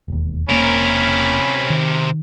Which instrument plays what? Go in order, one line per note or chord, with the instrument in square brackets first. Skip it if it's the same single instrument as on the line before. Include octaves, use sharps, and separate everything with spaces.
[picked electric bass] E1 D#2
[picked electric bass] E1 A#3 [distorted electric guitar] C3 A#4 [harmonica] C#4 B5
[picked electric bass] D#3